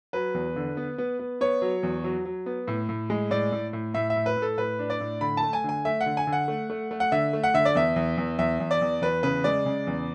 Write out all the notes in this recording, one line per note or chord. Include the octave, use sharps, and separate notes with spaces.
F#3 B4
E2
D3
B3
B3
B3
B3 C#5
F#3
E2
F#3
F#3
B3
A2
A2
G#3
A2 D5
A2
A2
A2 E5
E5
A2
B4
A2
A4
A2 B4
D4
D5
A2
D3 B5
A5
A3
G#5
D3 G#5
A3 E5
F#5
D3
G#5
D3
F#5
A3
A3
A3
F#5
D3 E5
A3
F#5
D3 E5
D5
E2 E5
E2
E2
E2 E5
E2
D5
E2
E2 B4
C#3 B4
G#3 D5
C#3
E2